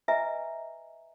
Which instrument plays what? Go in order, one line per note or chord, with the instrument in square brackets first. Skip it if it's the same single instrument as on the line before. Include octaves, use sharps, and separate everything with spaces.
[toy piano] B4 D#5 E5 G#5 A#5